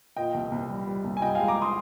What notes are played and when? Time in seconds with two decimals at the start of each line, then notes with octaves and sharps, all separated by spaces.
0.17 A#2 D#5 G5
0.34 C2
0.52 C2
0.70 G3
0.87 G3
1.04 C2
1.17 G#5
1.22 G2 D#5 G5
1.35 G#3 F5 G#5
1.48 A#5 D6
1.62 C6 D#6